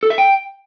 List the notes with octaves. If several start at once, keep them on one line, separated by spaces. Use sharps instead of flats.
A4
E5
G5